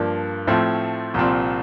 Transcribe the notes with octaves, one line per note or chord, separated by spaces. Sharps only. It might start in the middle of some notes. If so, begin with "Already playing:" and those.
Already playing: G2 F3 A#3 D4
A2 F3 A3 C4
C2 A#2 F3 C4